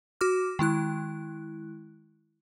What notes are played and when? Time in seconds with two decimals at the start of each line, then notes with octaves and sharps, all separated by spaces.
0.21 F#4 D6 F6
0.59 D#3 G#3 E4 F#6